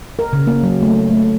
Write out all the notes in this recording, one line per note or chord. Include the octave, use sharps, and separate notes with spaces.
A#4
C#3
A#3
F#3
A3
A3